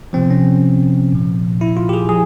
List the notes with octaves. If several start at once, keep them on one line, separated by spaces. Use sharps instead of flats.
C3 F3 C4
C#4
A#2 F3
E4
F4
G4
G#4
F3 G#4